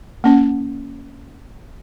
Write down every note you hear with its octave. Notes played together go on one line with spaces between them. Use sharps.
A#3 C#4 F#5